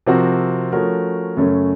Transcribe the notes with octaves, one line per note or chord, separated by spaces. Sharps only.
C3 F3 C4 F#4 A#4
F3 A3 C#4 F#4 A#4
F#2 C#3 A3 C#4